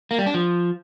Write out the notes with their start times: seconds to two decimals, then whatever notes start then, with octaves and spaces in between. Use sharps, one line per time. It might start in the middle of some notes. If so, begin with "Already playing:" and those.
0.11 A#3
0.19 G3
0.26 D4
0.34 F3